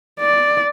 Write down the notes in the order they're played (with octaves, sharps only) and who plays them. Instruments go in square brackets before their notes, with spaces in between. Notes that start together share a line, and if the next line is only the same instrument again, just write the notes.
[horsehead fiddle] D5